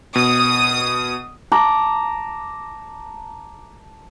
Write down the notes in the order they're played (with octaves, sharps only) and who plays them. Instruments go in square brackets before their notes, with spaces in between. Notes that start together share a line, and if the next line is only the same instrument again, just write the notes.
[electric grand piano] B2 [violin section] D#6
[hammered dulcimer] A5 A#5 D6